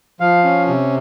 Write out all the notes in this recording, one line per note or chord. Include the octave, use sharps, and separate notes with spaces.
F3 F5
C#4
C3